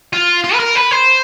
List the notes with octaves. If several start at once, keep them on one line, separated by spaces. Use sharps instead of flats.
F4
F4
B4
A#4
B4
C5